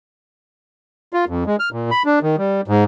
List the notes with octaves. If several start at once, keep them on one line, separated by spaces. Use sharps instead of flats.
F4
F2
G#3
F6
A#2
B5
D4
D#3
G3
G#2